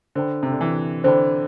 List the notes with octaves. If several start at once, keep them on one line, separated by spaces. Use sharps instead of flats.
D3 C5 G5 B5
C3
D3
E3
D3 C5 G5 B5